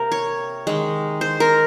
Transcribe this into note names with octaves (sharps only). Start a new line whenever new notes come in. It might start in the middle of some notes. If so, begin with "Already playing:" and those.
Already playing: C3 A#3 A#4
C#5
D#3 G#3
C5
A#4